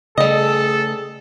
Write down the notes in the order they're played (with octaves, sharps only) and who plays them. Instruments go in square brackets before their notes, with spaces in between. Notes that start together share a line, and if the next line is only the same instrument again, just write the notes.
[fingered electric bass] C#3 A3 [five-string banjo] G3 D#5 [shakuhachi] G#4 [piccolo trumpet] A4